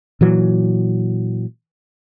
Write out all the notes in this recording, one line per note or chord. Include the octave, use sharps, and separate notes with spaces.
A#2 E3 F#3